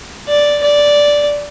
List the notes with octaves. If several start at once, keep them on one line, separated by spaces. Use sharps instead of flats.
D5
D5